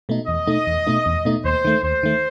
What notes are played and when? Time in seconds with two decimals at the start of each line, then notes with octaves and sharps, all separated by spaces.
0.09 B2 A3 D#4
0.28 E2 D#5
0.47 B2 A3 D#4
0.67 E2
0.87 B2 A3 D#4
1.06 E2
1.25 B2 A3 D#4
1.44 D#2 C5
1.65 D#3 A3
1.83 D#2 C5
2.03 D#3 A3